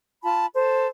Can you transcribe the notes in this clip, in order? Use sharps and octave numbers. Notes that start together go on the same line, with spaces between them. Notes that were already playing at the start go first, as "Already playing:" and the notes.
F4 A5 B5
A4 C5